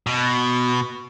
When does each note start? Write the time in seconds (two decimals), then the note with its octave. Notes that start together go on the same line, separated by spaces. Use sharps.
0.07 B2